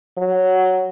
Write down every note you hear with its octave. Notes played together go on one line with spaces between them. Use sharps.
F#3